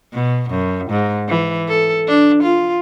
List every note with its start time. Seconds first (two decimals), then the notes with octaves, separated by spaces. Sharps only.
0.14 B2
0.50 F#2
0.90 G#2
1.29 E3
1.68 A4
2.08 D4
2.43 F4